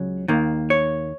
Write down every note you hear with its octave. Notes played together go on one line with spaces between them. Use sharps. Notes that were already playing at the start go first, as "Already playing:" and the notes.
Already playing: C#2 C#3 F#3
D#2 D#3 A#3
C#5